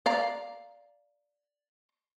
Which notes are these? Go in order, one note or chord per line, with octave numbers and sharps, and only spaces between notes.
D5 F5 A#5